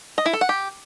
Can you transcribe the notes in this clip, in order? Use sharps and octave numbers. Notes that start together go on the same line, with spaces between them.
D#5
E4
A4
F#5
G4